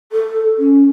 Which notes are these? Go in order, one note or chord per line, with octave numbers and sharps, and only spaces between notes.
A4
C#4